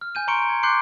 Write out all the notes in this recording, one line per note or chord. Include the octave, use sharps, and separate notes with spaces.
F6
G#5 G6 D#7
A#5 C6 C#6 C#7 D7
G#6
C6 D6 F#6 G6 C7 C#7